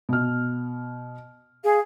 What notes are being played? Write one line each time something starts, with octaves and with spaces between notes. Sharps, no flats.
B2 F6
G#4 F5